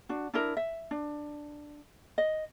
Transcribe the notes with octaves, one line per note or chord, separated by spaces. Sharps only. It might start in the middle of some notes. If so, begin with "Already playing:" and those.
D4 F#4
D4 E4 A#4
E5
D4
D#5